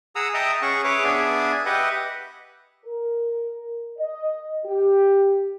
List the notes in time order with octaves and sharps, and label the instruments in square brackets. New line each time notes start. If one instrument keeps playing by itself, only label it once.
[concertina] G#4 F#5 A#5 D#6 E6
D#5 E5 G5 A5 A#5 D#6
C#4 G#4 F#5 C#6
G#4 B4 C#5 E5 D6
B3 D4 G#4 D5 E5 G#5
G4 B4 D#5 E5 F#5
[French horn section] A#4
D#5
G4